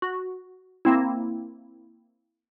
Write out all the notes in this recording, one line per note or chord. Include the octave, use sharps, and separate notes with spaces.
F#4
A#3 C4 E4